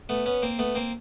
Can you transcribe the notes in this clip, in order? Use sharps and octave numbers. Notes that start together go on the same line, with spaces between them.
A3 B3
B3 C#4
A#3 C4
A3 B3
A#3 C4